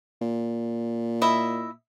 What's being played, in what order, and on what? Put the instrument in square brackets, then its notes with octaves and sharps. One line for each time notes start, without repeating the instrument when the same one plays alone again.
[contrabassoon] A#2
[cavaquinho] E4 D#5 E5